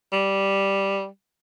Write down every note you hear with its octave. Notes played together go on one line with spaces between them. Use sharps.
G3